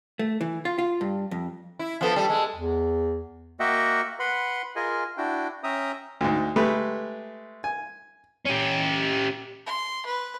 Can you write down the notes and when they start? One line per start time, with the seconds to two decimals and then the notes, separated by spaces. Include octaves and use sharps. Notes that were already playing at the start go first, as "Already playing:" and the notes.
0.19 A3
0.41 E3
0.65 F4
0.79 F4
1.01 G2
1.31 F2
1.79 E4
2.01 F3 B3 D4 A4
2.16 G3
2.30 G#3
2.54 E2
3.60 A#3 F#4 D#5 E5 F#5 G5
4.19 B4 F#5 B5 C6
4.76 F4 G#4 A#4 D#5 G#5
5.17 D4 E4 F#4 G5
5.64 C#4 E5 G5 A#5 D#6
6.21 D2 G#2
6.56 G#3 A3 G4 B4
7.64 G#5
8.45 C#4 G4
9.66 C6
10.06 B4